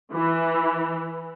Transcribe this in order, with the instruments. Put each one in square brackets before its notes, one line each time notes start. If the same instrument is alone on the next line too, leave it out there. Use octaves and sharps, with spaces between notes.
[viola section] E3